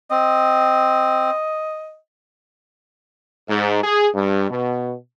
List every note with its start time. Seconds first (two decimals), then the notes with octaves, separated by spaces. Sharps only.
0.11 C4 D#5
3.49 G#2
3.83 G#4
4.14 G2
4.50 B2